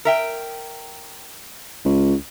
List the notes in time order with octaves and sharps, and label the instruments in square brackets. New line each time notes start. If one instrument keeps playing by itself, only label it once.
[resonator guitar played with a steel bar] A#4 E5 G5
[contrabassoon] C#2